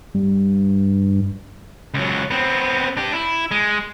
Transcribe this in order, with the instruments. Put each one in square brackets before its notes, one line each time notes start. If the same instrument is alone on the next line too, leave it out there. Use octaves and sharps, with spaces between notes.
[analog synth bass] G2
[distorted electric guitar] C#2 F#3
B3 C4
D4 G4
E4
G#3